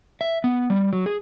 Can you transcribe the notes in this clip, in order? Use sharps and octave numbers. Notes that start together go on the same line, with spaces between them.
E5
B3
G3
F#3
G#4